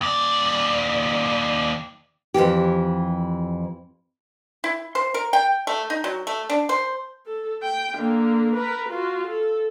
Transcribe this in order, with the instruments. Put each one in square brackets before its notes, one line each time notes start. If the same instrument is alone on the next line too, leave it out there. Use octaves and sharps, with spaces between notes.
[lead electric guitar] D#2 D5
[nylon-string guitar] F2 G#2 E3 G4
[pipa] E4
C5
A#4
G5
A3
D#4
F#3
A3
D4
C5
[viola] A4
G5
D3 A#3
A#4 B4
F4 F#4
A4